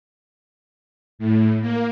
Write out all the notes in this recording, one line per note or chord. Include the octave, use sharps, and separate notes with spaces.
A2
A#3